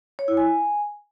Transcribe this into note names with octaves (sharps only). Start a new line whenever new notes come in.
C#5
E4
G#5